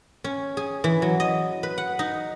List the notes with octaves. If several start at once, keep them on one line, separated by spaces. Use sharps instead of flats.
C#4
G#4
E3
F#3
D#5
B4
F#5
D#4